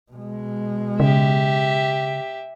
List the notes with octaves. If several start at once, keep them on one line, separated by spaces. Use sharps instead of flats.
B2 G#3
C#3 G4 E5